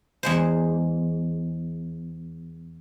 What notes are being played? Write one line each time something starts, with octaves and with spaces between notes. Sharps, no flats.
E2 G#3 C5